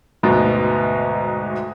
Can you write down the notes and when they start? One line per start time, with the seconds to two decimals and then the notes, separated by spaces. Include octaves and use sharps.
0.23 D2 G#2 B2